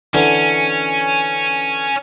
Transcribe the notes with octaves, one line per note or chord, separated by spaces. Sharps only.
D3 E3 C#4